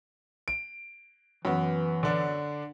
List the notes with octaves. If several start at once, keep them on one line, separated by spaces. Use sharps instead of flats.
D7
F#2 E3 B3
D3 D4